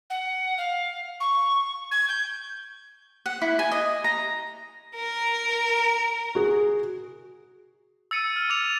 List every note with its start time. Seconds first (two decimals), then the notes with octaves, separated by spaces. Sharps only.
0.10 F#5
0.58 F5
1.20 C#6
1.91 G#6
2.08 G6
3.26 F#5
3.42 E4
3.59 G#5
3.71 D#5
4.04 A#5
4.96 A#4
6.35 F#4 G#4
8.11 E6 A6 C#7 D#7
8.36 F6
8.50 D6 A6 F7